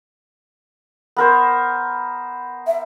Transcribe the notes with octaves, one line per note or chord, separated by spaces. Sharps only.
B3 A#4 C5
E5